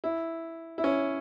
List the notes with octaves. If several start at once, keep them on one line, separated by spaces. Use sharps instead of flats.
E4
E4
C#4